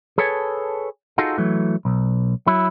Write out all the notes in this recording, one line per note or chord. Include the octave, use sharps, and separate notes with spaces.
G#4 A4 B4 C#5 G#5 A5
D#4 F4 F#4 G#4 A4
E3 F#3 A3
B1
F#3 E4